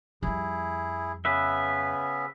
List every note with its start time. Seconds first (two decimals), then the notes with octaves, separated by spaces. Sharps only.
0.23 F2 G3 E4 G#4
1.25 C#3 B3 C#4 B4 E5